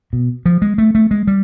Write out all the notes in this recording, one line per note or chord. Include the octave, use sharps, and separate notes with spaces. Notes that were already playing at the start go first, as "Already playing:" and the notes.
B2
F3
G#3
A3
A3
G#3
G3